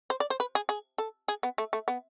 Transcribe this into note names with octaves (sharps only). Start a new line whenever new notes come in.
C5
D5
C5
B4
G#4
G#4
A4
G#4
B3
A3
A3
B3